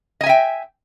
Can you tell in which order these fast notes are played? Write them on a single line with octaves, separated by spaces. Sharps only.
D#5 G#5 E5 G5